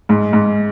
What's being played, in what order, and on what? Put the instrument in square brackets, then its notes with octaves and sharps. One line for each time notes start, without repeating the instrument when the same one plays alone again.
[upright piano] G#2
G#2